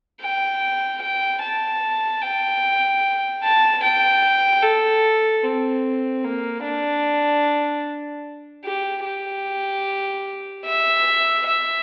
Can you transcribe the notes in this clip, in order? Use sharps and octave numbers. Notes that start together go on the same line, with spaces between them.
G5
G5
A5
G5
A5
G5
A4
C4
A#3
D4
G4
G4
E5
E5